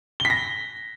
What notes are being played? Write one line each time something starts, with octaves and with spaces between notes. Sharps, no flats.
G7
B6
A#6